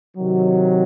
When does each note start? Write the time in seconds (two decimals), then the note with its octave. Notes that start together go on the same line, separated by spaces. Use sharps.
0.17 C3 D#3 F#3